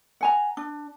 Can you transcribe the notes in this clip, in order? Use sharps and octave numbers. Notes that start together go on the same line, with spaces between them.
F#5 G#5 A#5
D4